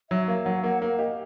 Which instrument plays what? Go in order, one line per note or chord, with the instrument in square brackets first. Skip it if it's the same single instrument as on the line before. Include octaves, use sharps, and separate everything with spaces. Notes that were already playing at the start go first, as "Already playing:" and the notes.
[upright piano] F#3 [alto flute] E5
[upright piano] A#3 [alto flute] F5
[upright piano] F#3 [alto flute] F#5
[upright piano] A#3 [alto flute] F#5
[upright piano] A#3 [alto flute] F5
[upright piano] G4 [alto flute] D#5